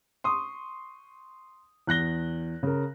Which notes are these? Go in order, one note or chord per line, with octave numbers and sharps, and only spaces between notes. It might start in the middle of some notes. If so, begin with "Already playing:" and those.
C6 C#6 D#6
E2 F#6 A#6 G7
C#3 A#4